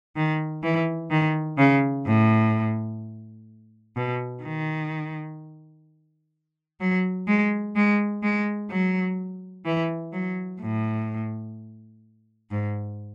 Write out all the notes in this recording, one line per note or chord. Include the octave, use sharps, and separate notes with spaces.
D#3
E3
D#3
C#3
A2
B2
D#3
F#3
G#3
G#3
G#3
F#3
E3
F#3
A2
G#2